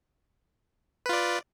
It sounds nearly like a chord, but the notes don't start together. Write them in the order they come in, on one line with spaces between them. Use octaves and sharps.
B4 F4 D5